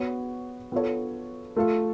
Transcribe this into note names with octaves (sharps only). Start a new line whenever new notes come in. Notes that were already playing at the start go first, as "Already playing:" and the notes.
Already playing: B3 F#4 C#5
B3 F4 A4 C#5
A3 F4 A4